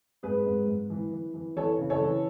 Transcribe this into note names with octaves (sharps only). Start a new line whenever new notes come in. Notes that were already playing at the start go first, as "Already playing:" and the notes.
G#2 G#4 B4
G#2
G#2
E3
E3
E3
E3 A4 C#5
C#3
A4 C#5
E3